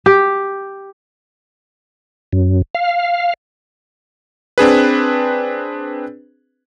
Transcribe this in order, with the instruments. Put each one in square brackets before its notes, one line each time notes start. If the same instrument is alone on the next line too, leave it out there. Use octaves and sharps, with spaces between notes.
[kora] G4
[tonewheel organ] F#2
F5
[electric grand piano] C4 D4 G#4 B4